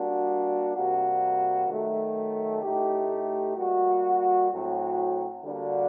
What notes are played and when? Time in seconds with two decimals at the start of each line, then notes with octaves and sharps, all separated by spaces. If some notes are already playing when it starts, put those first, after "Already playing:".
Already playing: G3 A#3 D4 F#4
0.75 C3 G3 A#3 F#4
1.69 D#3 F#3 A3
2.63 A2 A3 D#4 G4
3.57 G3 A#3 F#4
4.51 A2 F#3 C4 F#4
5.45 D3 G3 A#3 D4 F#4